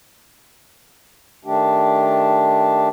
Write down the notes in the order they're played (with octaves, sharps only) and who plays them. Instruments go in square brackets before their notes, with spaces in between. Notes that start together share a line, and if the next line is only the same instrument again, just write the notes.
[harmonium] D#3 A3 D4 G4